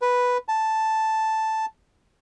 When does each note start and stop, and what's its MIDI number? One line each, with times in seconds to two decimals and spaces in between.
0.02 0.38 71
0.48 1.66 81